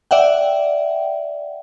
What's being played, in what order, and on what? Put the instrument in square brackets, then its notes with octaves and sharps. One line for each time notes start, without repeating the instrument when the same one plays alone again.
[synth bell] D5 E5 F#5 G5